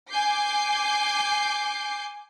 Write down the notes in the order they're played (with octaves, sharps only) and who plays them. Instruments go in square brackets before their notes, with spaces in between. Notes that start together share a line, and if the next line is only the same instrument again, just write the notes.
[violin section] G#5 D6 G6 C7